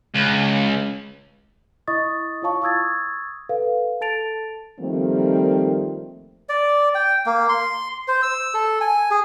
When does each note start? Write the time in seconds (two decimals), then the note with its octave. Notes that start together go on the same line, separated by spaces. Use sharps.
0.14 C#2
1.88 E4 D#5 C#6 D#6 A6
2.42 E4 F4 C#5 F5 A5 C#6
2.62 C#6 D#6 E6 G#6 A6
3.49 A4 B4 F5
4.01 A4 A5 A6 D7 F7
4.79 D#3 F3 G3 A3 A#3 C4
6.49 D5
6.95 G5
7.26 A#3
7.49 C6
8.08 C5
8.23 E6
8.54 A4
8.81 G#5
9.11 G#4